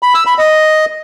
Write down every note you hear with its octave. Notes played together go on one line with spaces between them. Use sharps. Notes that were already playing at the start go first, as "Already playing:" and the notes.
B5
E6
B5
D#5